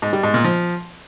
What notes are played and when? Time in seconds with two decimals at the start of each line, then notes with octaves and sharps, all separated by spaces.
0.02 G#2
0.13 G3
0.23 G#2
0.34 A#2
0.44 F3